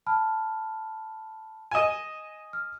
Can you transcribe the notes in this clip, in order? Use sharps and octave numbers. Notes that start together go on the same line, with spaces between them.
A5 B5 F6
D#5 G#5 D#7 E7
F6